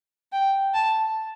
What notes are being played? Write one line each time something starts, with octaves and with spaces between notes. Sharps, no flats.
G5
A5